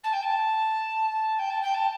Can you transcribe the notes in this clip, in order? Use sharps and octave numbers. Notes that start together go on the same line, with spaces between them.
A5
G5
A5
G5
A5
G5
A5